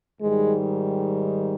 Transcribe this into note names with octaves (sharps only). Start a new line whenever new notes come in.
G#2 D#3 G3 G#3